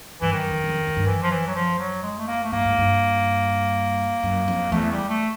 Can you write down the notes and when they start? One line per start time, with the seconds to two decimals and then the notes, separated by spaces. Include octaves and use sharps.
0.21 G2 E3
0.33 F#2 D#3
0.50 F2
0.64 F#2
0.69 F2
0.87 F2
0.97 G2
1.05 F#2 E3
1.22 F3
1.30 E3
1.47 F#3
1.55 F3
1.79 F#3
2.03 G#3
2.19 A3
2.27 A#3
2.43 A3
2.52 G2 A#3
2.65 G#2
2.78 G2
4.23 F#2
4.48 F2
4.72 E2 A3
4.91 G3
5.09 A3